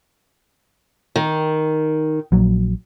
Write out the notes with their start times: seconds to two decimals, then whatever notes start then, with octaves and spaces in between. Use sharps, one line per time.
1.16 D#3
2.32 A#1 F#3